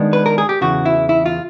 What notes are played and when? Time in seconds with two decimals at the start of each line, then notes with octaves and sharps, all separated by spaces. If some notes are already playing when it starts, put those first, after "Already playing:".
Already playing: D#3 G#3 B3 D4
0.13 B4
0.26 A#4
0.38 G#4
0.49 G4
0.61 E2 C#3 E3 F#4
0.85 E4
1.09 E4
1.26 F4